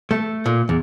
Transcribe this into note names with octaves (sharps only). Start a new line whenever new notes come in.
A3
A#2
E2